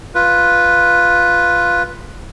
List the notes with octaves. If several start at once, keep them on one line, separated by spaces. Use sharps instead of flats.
F4 B4